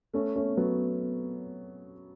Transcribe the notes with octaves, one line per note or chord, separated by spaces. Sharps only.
A3 C#4
A3 C#4
F#3 B3